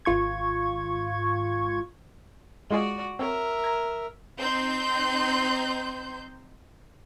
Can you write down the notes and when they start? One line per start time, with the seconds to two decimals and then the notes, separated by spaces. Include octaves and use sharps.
0.05 G#1 F4 C#6 G#6
2.71 G#3 F4 F#4 G#4 D5
3.19 C4 A#4 C#5 E5
3.64 A#5 G#6
4.39 C4 D#4 C6 G6